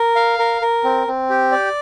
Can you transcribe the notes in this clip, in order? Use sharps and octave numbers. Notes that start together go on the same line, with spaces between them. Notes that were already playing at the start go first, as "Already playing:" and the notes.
Already playing: A#4
F5
A#4
A#4
C4
C4
G4
D5